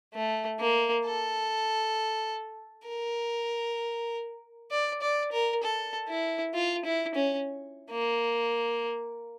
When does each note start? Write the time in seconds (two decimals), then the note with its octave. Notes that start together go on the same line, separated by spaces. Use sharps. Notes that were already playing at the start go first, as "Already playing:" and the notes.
0.14 A3
0.60 A#3
1.05 A4
2.88 A#4
4.71 D5
5.02 D5
5.32 A#4
5.63 A4
6.08 E4
6.55 F4
6.85 E4
7.15 C#4
7.91 A#3